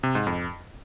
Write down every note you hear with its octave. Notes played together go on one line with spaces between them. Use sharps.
C3
G#2
F2